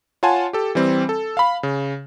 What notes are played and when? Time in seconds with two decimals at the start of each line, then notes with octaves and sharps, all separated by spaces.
0.23 F4 C#5 F#5 G#5 A5 C6
0.53 G4 A4
0.75 E3 G3 C4
1.09 A4
1.37 F5 B5
1.63 C#3